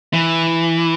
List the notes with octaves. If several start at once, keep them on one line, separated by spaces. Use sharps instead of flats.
E3